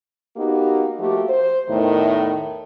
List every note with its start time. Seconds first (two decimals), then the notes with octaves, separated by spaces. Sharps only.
0.37 A#3 B3 D#4 F#4 G4
0.99 F3 A3 A#3 F#4 G4
1.29 C5
1.69 E2 A2 D#3